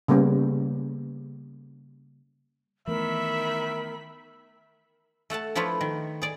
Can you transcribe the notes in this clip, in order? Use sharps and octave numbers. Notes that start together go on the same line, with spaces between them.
C#3 G3 A#3 B3 C#4
D#3 E3 A3 B3 A#4 E5 B5
A3 A4 F#5 A5
F3 A3 E4 F4 B4 C#5
D#3
G#4 D5